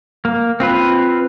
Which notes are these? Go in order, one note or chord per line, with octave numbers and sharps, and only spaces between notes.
A#3
C4 F4 B4